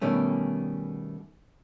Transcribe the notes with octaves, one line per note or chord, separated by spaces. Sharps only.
B2 D#3 G3 A3 C#4